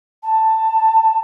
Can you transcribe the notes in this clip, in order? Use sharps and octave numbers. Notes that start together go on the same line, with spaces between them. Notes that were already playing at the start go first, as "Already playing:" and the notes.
A5